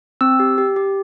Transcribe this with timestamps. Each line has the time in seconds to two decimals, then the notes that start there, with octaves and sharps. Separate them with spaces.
0.21 C4 E6
0.40 G4
0.58 G4
0.76 G4